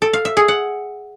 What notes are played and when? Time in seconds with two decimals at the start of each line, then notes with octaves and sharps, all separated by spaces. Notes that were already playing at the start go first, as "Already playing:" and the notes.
0.02 A4
0.13 F5
0.25 E5
0.37 G#4
0.48 F#5